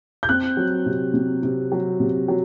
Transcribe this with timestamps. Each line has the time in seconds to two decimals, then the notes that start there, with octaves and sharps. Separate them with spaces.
0.23 G6
0.29 C4 F#6
0.57 F#3
0.86 C3
1.14 C3
1.43 C3
1.72 F#3
2.00 C3
2.28 F#3